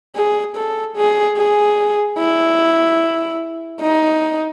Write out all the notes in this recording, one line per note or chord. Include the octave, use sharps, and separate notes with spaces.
G#4
A4
G#4
G#4
E4
D#4